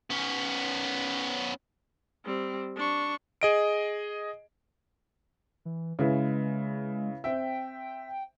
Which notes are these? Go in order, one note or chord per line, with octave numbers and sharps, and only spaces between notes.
B3 C#4
G3 C4
D4 C#6
G#4 D#5 D7
E3
C#3 G#3 E4 B4
C4 E5 G5